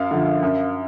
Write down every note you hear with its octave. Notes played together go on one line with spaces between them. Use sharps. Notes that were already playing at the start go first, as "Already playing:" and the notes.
Already playing: F#2 F5
D3 F3
F#2